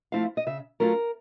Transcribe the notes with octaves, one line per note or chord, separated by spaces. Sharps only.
F3 A3 C4 E4 F5
D#5
C#3 E5
F#3 A3 C#4 F4 A#4